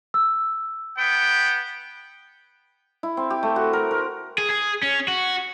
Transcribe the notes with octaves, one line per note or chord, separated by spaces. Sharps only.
E6
B3 G5
E4
C4
G4
A3
F#4
A#4
A#4
G#4
G#4
C#4
F#4